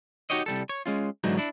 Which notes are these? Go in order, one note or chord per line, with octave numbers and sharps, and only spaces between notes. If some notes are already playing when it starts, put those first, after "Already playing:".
D#4 F#4 G4 C#5 D#5
C2 G3 A4
C#5
G#3 C#4 F4
G#2 D3 E3 F#3 D#4
D4 E4